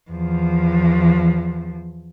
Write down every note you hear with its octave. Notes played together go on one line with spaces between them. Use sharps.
E2 F3